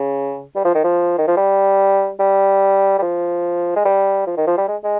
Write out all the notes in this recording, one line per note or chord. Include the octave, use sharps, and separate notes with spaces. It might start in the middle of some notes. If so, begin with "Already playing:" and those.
Already playing: C#3
G3
F3
D#3
F3
D#3
F3
G3
G3
G3
F3
G#3
G3
F3
D#3
F3
G3
G#3
G#3